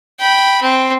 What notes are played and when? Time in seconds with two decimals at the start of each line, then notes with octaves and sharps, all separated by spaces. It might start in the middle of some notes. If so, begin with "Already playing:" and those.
0.20 G5 B5
0.62 C4